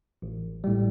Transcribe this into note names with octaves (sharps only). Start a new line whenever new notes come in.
A1
A2 G3